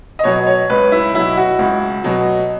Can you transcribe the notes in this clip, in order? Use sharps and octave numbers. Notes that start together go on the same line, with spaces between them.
D#5
B2 F#3 C#5
C#5
C#2 B4
E4
B2 F#3 E4
F#4
C#2
B2 F#3